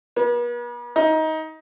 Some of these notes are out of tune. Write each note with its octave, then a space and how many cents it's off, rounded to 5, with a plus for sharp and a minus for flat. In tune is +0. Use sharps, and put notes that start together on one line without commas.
B3 -45
D#4 +20